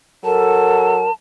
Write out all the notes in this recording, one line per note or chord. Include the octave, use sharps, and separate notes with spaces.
F#3 A4 A#4 A5